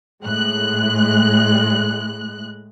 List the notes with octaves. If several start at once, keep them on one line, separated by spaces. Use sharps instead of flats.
A2 G#3 F#6